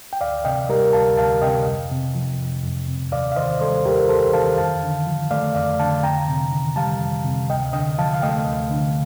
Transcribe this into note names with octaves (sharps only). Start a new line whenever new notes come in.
G5
D2 D5 F5
C3 D#5 G5
G3 G4 A#4
D2 F5 A5
D2 F5 A5
C3 D#5 G5
F2
C3
F3
F2
F2
C3
D#2 D5 F5
F5
D#3 C5 D#5
G3 A4 C5
D#2 G4 A#4
D#2 A4 C5
D#3 F5 A5
F2 F5 A5
D3
F3
A3 D5 F5
F2 D5 F5
D3 F5 A5
F2 G5 A#5
C3
D#3
G3 F5 A5
F2
C3
D2 D#5 G5
D3 D#5 G5
F3 F5 A5
F5
A3 D#5 G5
D2
D3